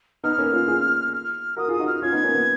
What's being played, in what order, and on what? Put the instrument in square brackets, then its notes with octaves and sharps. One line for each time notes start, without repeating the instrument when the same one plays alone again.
[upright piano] B3 D#4 [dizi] F6
[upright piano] A#3 C#4
C#4 F4
F4 G#4
[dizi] F6
[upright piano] F#4 A#4 [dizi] D#6
[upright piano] F4 G#4 [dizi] D#6
[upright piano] D#4 F#4
[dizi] F6
[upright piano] C#4 F4 [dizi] G#6
[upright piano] B3 D#4
A#3 C#4
B3